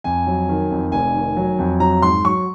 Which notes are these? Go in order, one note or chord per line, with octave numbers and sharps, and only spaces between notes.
F2 G#5
F#3
D#3
F2
F1 G#5
D#3
F#3
F2
F#3 A#5
G#2 C6
F#3 C#6